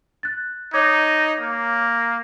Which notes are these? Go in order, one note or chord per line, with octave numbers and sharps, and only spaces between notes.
F#6 A6
D#4 C#5 D6 G#6
A#3